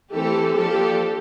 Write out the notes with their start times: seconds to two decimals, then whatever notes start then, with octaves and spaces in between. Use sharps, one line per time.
0.13 E3 A3 C4 G4 A4
0.56 F3 A#3 D4 G4 A4